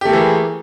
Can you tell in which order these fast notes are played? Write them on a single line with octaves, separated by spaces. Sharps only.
G4 A3 A#3 E3 G#4